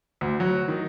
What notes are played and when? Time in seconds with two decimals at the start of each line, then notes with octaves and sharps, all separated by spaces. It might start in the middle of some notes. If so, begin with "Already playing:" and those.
0.21 D2
0.40 F#3
0.68 D#3